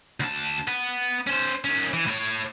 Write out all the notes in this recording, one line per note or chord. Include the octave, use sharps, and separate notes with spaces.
D2 A5
B3
C#4 C5
D#3 C#4
E3
A2 C#5